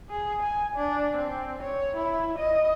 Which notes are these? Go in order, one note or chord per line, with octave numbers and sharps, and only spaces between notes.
G#4
G#5
D4
C4
C#5
E4
D#5